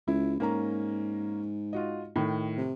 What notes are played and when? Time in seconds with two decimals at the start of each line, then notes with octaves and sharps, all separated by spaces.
0.08 C#2 E4
0.40 G#2 A#3 C#4 A#5
1.73 F4 F#4 D#5
2.16 A2 D#3
2.57 C3